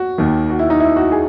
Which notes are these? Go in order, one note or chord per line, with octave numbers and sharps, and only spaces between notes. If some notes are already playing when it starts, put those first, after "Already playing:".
Already playing: F#4
D#2 D#3
F#4
E4
D#4
E4
F#4
G#4